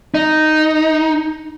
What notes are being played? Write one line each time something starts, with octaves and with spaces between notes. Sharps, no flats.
D#4